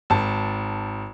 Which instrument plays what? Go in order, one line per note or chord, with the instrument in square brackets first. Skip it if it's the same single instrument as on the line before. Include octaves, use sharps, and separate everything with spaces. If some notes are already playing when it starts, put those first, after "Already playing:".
[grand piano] G#1 A5